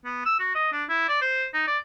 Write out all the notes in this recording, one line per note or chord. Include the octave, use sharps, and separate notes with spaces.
B3
E6
F#4
D#5
D4
E4
D5
C5
D#4
D5